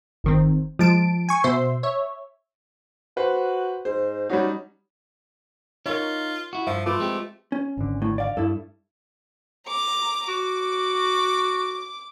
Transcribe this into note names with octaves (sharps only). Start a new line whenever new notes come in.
G1 D#3 C4
F3 G#3 A5 D7
G#5 C#6
B2 C5 E5 C6
C#5 E5
F#4 B4 C5
G#2 C5
F#3 G3 C#4 D#4
D#4 F4 A#4 C#5
E4 F#4
G2 F3 E5 F5
A3 F4 B4 D6
G#3 C4 G4
C#4
G#1 D3
A2
D5 F5
G2 E4 A4
A#5 D6
F#4 D6